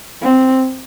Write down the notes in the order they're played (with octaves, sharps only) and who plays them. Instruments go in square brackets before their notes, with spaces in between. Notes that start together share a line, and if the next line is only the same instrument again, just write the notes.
[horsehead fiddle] C4